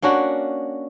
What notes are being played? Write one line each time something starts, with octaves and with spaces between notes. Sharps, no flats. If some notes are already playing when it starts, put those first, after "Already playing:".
A#3 C#4 D4 F#4